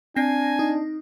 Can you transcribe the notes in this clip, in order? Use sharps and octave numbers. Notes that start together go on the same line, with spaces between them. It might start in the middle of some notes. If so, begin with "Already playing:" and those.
C4 D4 G#5 A#6
D#4